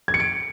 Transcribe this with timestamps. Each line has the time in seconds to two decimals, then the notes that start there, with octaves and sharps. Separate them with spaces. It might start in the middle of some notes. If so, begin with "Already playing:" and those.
0.08 G#6
0.14 C#7
0.20 D7